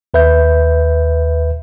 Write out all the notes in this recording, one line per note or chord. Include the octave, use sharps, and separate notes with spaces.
D#2 B4 E5 G6